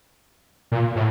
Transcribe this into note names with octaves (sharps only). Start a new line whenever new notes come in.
A#2
A2